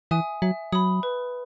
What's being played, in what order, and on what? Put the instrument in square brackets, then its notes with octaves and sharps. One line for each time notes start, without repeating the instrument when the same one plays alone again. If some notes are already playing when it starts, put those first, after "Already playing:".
[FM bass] E3 [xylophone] E5 G#5 D#6
[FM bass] F#3 [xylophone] E5
[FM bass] F#3 [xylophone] B5 D#6
[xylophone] B4